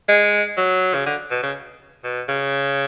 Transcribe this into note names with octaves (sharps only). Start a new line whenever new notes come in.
G#3
F#3
C#3
D3
B2
C#3
B2
C#3